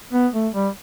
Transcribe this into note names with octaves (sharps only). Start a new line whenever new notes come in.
B3
A3
G3